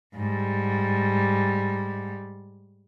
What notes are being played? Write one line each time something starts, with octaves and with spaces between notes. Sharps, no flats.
G#2 G3